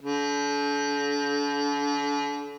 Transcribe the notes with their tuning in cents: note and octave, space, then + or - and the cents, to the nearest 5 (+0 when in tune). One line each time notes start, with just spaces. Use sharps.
D3 -40